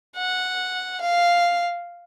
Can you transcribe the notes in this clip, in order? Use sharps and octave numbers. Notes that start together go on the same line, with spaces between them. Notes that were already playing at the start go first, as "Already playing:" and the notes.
F#5
F5